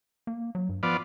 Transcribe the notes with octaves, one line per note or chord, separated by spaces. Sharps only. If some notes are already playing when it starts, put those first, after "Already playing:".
A#3
F#3
G2
F3 B3 F4 D5